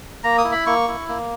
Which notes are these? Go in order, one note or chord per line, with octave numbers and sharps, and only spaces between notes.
A#3 A#5
D#6
E4
B5
A#3 C#6
E4
A#3